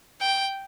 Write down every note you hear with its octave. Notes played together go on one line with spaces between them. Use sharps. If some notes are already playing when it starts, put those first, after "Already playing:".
G5